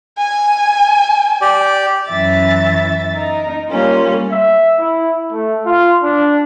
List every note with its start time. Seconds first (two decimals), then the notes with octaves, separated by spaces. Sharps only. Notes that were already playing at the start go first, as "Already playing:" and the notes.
0.18 G#5
1.41 G4 D5
2.08 F#2 E3 E5 A6
3.13 D#4 A#4
3.70 G3 A#3 C#4 F4
4.32 E5
4.79 E4
5.32 A3
5.66 F4
6.03 D4